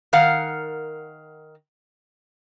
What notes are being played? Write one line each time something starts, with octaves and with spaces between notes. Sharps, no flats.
D#3 A#4 F5 F#5